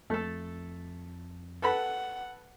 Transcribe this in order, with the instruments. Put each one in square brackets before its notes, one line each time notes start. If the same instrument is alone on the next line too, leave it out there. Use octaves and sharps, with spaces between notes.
[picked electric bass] F2 [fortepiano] A3 A4
[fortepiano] A4 B4 B5 [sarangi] F#5